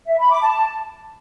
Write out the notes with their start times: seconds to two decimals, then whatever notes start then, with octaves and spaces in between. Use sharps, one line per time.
0.08 E5
0.19 B5
0.30 D6
0.42 A5